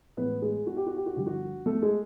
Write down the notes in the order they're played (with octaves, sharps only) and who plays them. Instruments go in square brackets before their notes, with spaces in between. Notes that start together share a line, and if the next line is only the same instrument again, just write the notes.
[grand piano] A1 A2 E3 G#3 B3 C#4 B4
G#3 G#4
F#4
G4
F#4
G4
F#4
G1 G2 D3 F3 G4
F#4
A3 A4
G#3 G#4